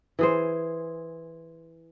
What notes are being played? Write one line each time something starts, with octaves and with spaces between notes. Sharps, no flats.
E3 G#4 C5